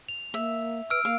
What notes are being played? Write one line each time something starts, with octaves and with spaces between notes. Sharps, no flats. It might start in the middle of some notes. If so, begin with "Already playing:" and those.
F7
A#3 E5
B4 E6 F6 D7
A#3 F5